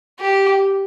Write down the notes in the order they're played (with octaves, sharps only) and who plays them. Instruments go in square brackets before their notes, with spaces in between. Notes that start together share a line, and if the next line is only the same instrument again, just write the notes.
[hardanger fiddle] G4